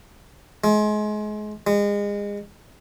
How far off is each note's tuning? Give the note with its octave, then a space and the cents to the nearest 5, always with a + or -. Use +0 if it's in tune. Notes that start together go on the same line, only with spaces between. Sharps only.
G#3 +30
G#3 -30